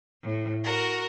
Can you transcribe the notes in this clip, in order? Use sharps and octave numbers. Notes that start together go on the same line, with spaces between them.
A2
F#4 A#4